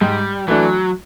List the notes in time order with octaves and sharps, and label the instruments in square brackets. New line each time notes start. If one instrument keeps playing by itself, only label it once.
[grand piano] G#2 [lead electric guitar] G3
[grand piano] E3 A3 D4 [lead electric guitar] F#3